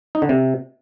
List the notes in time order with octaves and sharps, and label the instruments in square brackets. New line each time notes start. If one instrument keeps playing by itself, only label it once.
[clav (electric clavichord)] D#4
D3
C3